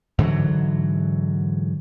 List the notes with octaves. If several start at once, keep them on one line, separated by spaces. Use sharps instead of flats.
G#2 D3 E3 F#3